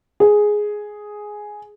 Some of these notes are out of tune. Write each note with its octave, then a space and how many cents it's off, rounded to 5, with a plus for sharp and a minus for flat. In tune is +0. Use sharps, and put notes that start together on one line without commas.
G#4 +5